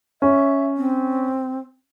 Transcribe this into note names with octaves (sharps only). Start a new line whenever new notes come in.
C#4 E5
C4